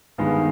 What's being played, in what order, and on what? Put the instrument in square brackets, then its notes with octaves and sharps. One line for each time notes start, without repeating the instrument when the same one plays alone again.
[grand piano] G2 D#3 G#3 B3 D#4